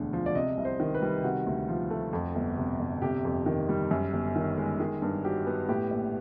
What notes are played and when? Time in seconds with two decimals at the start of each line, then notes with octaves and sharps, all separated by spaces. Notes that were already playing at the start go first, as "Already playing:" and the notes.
Already playing: E1 D2 D3
0.13 F3
0.26 D5
0.35 C3 D#5
0.57 C2
0.65 C5
0.80 D#3
0.94 B4
1.02 G3
1.23 C3 F#4
1.47 D2
1.69 F3
1.91 A3
2.13 F2
2.35 G1
2.57 C3
2.79 G1
3.02 C3 G4
3.25 F2
3.46 D#3
3.69 G3
3.91 F#2
4.13 G1
4.36 D#3
4.57 G#3
4.80 D#3 G#4
5.02 G2
5.24 F#3 G4
5.46 B3
5.69 A2 G4
5.91 A#1